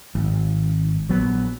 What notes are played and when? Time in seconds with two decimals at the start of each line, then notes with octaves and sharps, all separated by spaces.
0.15 G#1
1.09 A#1 F#3 B3